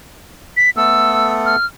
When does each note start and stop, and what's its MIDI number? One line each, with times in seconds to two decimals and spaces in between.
0.57 0.70 95
0.77 1.56 57
0.77 1.56 59
0.77 1.56 69
0.77 1.32 88
1.46 1.65 89